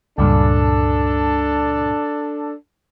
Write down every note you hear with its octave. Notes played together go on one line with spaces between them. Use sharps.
C#2 G2 A#2 D4 A4